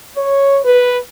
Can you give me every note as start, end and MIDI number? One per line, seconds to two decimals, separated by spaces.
0.18 0.58 73
0.64 0.97 71